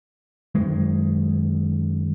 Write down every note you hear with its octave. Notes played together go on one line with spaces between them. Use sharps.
F#2 D#3 G#3